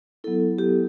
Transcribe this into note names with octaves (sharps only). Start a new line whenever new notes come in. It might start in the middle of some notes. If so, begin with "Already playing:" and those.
F#3 B3 E4 A4
G4